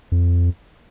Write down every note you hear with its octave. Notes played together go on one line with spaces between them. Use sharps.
F2